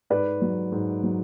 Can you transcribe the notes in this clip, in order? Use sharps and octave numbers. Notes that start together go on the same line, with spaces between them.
G#2 B4 D5
F#3
G#2
F#3